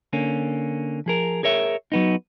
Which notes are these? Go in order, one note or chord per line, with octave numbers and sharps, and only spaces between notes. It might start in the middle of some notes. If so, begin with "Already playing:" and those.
D3 A#3 C#4
F3 G#4 A#4
G#4 A#4 C#5 E5
F#3 B3 D#4